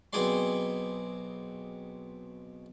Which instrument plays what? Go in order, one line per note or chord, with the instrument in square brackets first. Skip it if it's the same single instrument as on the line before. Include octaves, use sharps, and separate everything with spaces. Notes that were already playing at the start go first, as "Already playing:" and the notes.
[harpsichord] B1 B2 C4 G#4 D5 C6